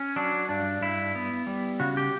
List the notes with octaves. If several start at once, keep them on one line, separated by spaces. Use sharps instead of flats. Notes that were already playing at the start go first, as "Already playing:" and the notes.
Already playing: C#4
F#3 D4
G2 D4
G2 E4
B3
G3
C#3 F#4
G4